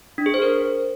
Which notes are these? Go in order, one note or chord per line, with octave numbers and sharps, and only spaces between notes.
D4
G#4
C5
A#4